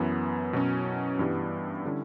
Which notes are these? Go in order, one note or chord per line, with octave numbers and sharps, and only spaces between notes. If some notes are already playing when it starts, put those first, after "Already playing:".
Already playing: F#2 E3 B3 E4
B2 F#3 C#4
G2 E3 G3 B3
D3 G3 C#4 E4